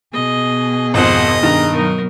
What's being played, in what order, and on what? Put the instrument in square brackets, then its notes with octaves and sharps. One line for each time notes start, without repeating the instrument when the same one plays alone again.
[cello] B2 G#4 [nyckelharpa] D#5
[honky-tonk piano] G#1 F2 [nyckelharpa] C5 F#5 [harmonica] D#5
[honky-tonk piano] G2 D#3 [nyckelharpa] A#5
[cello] B2 F#3 [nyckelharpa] D#4 A#4